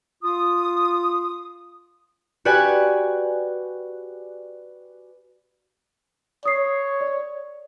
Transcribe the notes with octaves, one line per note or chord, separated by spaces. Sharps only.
F4 D#6
F#4 G4 B4 D5 G#5 F#6
C#5 D#6 C7
D5